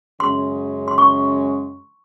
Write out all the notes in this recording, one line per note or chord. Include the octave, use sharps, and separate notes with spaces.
F#2 C#3 G#3 C#4 G#4 C6
C6
C#6